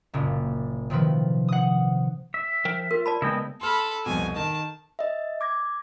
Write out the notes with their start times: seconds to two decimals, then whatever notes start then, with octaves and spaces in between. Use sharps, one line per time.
0.14 F#1 A#2
0.90 C3 D#3 F3 B4
1.48 F#5 D#6
2.34 E5
2.65 F3 A#4 G5
2.91 F4 A#4
3.06 D5 A5 B5
3.22 C#3 G#3 B3 E4 D#5 G5
3.61 A4 B5 C6 F6
4.06 C2 F2 B2 G#5
4.36 D#3 A5
4.99 D#5 E5
5.41 D6 G#6 A#6